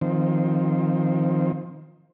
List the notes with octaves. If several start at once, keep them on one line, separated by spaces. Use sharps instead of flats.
D#3 F3 C4